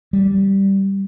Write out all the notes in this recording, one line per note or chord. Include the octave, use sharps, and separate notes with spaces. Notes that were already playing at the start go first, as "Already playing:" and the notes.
G3